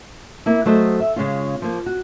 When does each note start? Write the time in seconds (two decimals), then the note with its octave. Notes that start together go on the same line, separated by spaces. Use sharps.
0.46 A#3 E4
0.66 F#3 A3 C5 D#5
1.00 E5
1.16 C#3 G#3 C#4 F4
1.62 F3 A#3
1.86 F#4